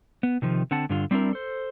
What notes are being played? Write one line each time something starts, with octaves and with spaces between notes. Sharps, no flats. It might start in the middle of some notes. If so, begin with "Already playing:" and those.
B3
C3 D#3 F3
D3 C4 F#5 A5
G2 D3 F4
G3 C4 D4 E4 A#4
A4 C5